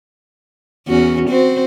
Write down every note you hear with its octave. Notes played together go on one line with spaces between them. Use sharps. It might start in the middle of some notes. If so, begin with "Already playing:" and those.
E2 C#4 F#4
C4 F#4 C5